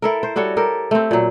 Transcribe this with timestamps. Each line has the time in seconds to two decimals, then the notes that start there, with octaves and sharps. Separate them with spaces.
0.02 E4 A4 A#4
0.23 C5
0.36 G3 F#4 A4 C#5
0.57 G4 A4 A#4
0.91 A3 C4
1.11 A#2 F#3